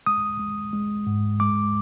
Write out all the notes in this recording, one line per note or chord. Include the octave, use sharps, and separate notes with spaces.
G#3 D#6
G#3
G#3
G#2
G#3 D6